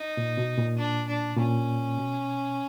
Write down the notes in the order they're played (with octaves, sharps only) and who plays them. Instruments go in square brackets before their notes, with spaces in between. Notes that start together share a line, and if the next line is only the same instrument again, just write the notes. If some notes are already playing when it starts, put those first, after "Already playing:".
Already playing: [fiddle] D#4
[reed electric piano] A#2
B2
A#2
[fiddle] D4
D4
[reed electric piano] A#2 [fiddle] C#4
[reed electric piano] B2